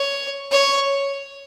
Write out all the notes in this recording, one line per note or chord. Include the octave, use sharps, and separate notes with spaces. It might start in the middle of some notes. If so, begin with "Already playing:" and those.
Already playing: C#5
C#5